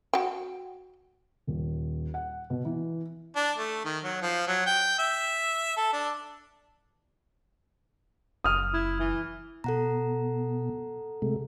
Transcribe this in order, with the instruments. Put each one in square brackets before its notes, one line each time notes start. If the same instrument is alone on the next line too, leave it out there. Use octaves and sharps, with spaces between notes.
[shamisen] F#4 G5
[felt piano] D#1
F#5
B2
E3
[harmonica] D4
A3
D#3
F#3
F3
F#3
G5
E5
A4
D4
[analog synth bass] F#1 [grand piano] D#6 F6
[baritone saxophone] E4
E3
[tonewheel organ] B2 [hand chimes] A4 F#5 A#5
[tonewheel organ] C3 G#3 A3